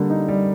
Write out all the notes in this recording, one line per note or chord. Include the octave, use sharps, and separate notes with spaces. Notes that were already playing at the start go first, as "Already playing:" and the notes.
Already playing: D3 G3 A#3
D#4
G3